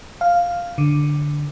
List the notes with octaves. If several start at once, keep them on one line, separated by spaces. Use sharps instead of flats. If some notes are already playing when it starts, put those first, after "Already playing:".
F5
D3